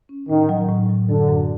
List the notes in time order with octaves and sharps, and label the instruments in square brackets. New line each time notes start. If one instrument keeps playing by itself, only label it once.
[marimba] C#4
[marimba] A2 [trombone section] D#3
[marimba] F#3
A2
F#3
[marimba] F#2 [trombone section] D3
[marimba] F#2